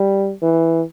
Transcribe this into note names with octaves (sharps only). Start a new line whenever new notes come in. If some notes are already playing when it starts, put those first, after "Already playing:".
Already playing: G3
E3